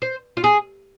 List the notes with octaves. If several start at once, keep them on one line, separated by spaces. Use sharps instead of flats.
C5
F4
G#4